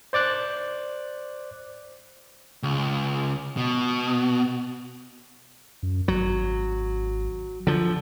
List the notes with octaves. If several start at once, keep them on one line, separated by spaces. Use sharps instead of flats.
C5 D5 D6 F#6
C#2
B2
F#2
G#1 F#3
D3 F3